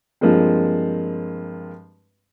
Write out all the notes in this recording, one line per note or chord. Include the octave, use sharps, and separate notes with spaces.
G2 F3 G#3 A#3 C4